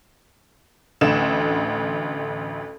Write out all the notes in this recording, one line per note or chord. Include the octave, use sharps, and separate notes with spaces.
A1 D2 E7